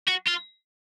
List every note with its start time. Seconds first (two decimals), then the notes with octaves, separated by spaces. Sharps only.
0.08 F#4
0.28 F4